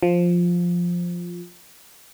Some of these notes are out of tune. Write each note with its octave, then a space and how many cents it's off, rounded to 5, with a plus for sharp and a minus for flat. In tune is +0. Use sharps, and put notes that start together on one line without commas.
F3 +5